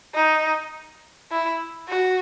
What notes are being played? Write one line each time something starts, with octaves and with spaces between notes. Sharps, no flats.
D#4
E4
F#4